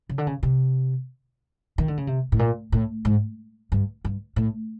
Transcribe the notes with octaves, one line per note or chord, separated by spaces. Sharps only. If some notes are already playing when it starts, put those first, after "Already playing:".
C#3
D3
C#3
C3
D#3
D3
C#3
C3
A2
A#2
A2
G#2
G2
G2
A2